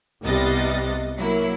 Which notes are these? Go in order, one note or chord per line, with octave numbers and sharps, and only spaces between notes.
C2 C3 G3 B3 D#5 A6
F#3 A#3 E4